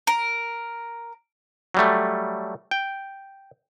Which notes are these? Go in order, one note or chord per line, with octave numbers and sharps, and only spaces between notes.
A#4
F#3 G3 A3
G5